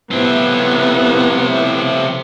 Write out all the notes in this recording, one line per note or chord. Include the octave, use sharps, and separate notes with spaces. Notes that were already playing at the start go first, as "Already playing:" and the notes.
A2 C3 F3 B3 C4 E4